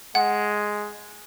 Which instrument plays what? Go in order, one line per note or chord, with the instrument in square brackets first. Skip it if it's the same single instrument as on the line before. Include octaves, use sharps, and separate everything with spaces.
[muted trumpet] G#3 [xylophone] F#5